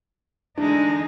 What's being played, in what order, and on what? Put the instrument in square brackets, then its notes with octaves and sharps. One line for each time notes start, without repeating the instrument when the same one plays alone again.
[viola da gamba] D3 E3 G#3 [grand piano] D4 [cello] D#4